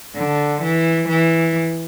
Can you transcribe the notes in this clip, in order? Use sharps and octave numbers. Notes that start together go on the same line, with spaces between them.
D3
E3
E3